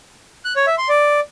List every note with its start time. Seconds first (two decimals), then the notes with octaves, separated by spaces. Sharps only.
0.45 F#6
0.56 C#5
0.67 E5
0.78 C6
0.89 D5